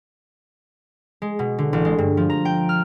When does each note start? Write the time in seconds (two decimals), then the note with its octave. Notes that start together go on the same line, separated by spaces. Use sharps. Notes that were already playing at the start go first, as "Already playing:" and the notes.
1.22 G#3
1.39 B2
1.58 D3
1.73 A1
1.85 G#3
1.98 G2
2.17 F3
2.30 A#5
2.45 G5
2.69 F6